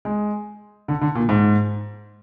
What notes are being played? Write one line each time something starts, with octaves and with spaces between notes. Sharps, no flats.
G#3
D3
D3
A#2
G#2